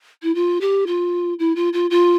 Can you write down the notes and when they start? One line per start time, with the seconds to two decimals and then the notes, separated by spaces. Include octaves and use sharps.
0.23 E4
0.35 F4
0.61 G4
0.87 F4
1.39 E4
1.56 F4
1.73 F4
1.90 F4